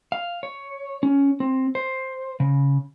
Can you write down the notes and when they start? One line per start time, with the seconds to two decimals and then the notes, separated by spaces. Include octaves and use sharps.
0.12 F5
0.43 C#5
1.03 C#4
1.40 C4
1.75 C5
2.40 C#3